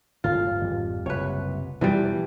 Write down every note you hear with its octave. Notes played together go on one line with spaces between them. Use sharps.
D1 G1 F4
G#1 F2 G3
F#1 C2 C3 B4 C#5
E1 E3 F3 G3 B3